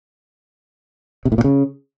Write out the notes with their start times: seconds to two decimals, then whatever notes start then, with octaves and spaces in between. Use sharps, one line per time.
1.25 C3
1.32 A2
1.38 A#2
1.44 C#3